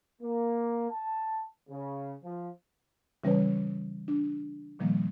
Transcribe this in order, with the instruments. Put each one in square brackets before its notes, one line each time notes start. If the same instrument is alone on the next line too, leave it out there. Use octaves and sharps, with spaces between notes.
[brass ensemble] A#3
A5
C#3
F3
[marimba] C#3 E3 G3 C#4 B4 C#5
D4
A#2 D#3 F3 G3 A#3